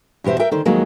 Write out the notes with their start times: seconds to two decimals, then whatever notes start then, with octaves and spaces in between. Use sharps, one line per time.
0.24 E2 B2 G4 C5 E5
0.39 A#4 E5 G5
0.51 D3 D#3 C5
0.65 F2 D#3 F#3 G#3 A#3